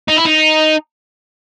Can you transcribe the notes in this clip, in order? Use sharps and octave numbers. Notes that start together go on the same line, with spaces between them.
D#4
E4
D#4